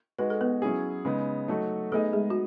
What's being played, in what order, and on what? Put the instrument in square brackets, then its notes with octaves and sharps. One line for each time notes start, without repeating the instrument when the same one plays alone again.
[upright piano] G#3 D#4 F#4 [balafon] B4
[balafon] A4
B3 B4
[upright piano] F#3 C#4 E4 G#4
C#3 G#3 B3 D#4
F#3 A3 D#4 F#4 A4
[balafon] A3 A4 [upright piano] B3 D#4 G#4 D#5
[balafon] G#3 G#4
F#4